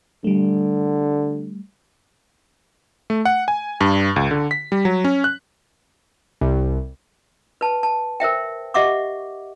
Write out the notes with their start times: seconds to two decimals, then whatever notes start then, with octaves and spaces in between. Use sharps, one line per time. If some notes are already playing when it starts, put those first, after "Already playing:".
0.24 D3 G3 A3
3.10 A3
3.25 F#5
3.48 G#5
3.81 G2
4.16 C#2
4.31 D3
4.51 B6
4.72 G3
4.85 F#3
5.04 C#4
5.24 F#6
6.41 C2
7.61 B4 A5
7.83 A5
8.20 A#4 C5 E5 G5
8.74 G4 D#5 E5 F#5 C#6 D6